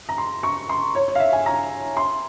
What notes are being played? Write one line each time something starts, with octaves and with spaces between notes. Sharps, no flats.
A#5
C6
C#6
C6
C#5
C#5
F5
E5
G#5
A#5
C6